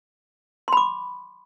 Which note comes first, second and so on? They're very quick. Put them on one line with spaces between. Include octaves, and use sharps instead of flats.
C6 B5 D6